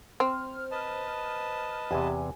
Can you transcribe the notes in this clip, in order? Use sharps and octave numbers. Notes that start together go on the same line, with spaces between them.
C4 C5 F6
B4 D#5 A5
E2 C3 G4 G#5